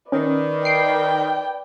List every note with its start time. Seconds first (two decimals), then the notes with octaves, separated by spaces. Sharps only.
0.12 D#3 C#4 B4 D5
0.65 G5 C7 D7